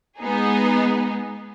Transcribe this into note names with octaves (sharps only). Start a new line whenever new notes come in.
G#3 B3 D#4 G#4